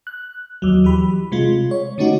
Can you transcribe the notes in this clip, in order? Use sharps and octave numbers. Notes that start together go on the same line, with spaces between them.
F#6
D#2 F#3
E3 F#3 G4 B5
C3 G#3 F4
C#5
D3 A3 C#4 D#4 F#4